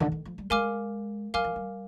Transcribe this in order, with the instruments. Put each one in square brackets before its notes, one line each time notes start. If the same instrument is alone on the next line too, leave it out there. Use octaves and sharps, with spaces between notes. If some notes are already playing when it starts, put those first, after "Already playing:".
[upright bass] D3
D#3
F3
G3
[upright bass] G#3 [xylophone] A#4 F5 G#5 D6 F6
[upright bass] G3 [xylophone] A#4 F5 G#5 D6 F6
[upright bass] F3
G3